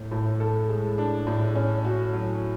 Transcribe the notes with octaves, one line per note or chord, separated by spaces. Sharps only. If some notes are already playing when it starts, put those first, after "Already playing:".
Already playing: A2
A2
A4
G#3
D4
A2
C#4
F#4
F#3